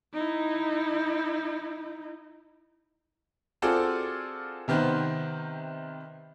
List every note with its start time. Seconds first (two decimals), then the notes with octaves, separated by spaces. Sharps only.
0.14 D#4 E4
3.62 C4 F4 F#4 G#4 A4 D5
4.68 C3 D#3 B3 C4